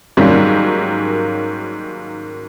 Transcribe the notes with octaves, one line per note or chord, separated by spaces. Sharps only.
G#2 D#3 F#3 G3 A#3 C#4